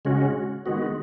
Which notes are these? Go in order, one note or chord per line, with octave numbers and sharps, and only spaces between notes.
C#3 G#3 C#4 F#4
D#3 G#3 B3 F#4